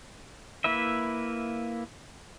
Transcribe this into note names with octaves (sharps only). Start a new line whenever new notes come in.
A#3 E4 B4 E5